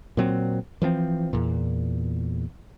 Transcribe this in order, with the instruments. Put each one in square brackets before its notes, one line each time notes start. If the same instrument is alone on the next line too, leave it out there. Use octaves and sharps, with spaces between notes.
[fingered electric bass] A#2 F#3 C4
E3 F3 A3 C4
E2 A#2